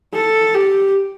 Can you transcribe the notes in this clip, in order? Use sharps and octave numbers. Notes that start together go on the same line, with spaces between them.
A4
G4